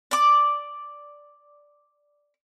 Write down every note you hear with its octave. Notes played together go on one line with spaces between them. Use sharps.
D5 D6